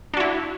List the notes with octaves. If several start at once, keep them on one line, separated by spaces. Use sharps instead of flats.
D4 E4 F#4